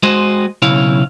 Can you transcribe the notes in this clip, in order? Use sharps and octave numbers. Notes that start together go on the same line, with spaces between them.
G#3 F#4 C5 D#5
B1 C#3 E4 C#5 F5